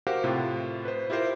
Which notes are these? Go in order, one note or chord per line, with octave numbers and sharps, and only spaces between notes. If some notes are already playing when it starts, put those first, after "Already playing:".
F#4 G4 A#4 C5 F5 F#5
A2 C3 F4
B4 C5
E4 F4 G4 A#4 C5